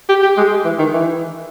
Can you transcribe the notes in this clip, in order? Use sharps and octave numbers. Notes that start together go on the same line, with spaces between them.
G4
G4
G#3
E3
D#3
E3